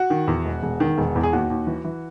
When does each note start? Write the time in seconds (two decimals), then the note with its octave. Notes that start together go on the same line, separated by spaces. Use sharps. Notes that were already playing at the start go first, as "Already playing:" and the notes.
Already playing: F#4
0.10 D#3
0.28 E2
0.45 E1
0.63 E1
0.80 D#3
0.98 E1
1.16 E2
1.23 G#4
1.33 D#2 F#4
1.50 D#2
1.67 E3
1.84 E3